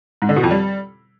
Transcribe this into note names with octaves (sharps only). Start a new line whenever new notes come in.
G#2
D3
B2
F2
G3